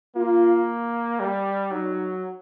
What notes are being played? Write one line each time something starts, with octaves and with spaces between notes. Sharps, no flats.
A#3 F4
G3
F#3 D#4